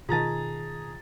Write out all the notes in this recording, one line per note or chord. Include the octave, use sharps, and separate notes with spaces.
B2 D#3 F4 G#4 A5 A#5 A6